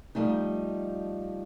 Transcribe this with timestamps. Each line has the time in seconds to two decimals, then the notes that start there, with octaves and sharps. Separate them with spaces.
0.15 F3 G3 A3 D#4